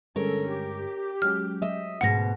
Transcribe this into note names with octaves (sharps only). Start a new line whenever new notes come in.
G2 D3 G#3 C#4 A4 A#4 C#5
G4
F#3 G#3 C#4 F6
D#5 E5
D2 G#2 B2 F#5 A#6